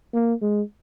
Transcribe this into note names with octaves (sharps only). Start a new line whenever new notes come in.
A#3
G#3